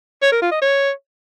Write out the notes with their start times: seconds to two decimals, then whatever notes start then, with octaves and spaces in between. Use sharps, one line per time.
0.22 C#5
0.32 A#4
0.42 F4
0.52 D#5
0.61 C#5